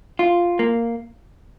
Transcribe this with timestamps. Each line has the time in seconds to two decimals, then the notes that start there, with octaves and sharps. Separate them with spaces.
0.19 F4
0.59 A#3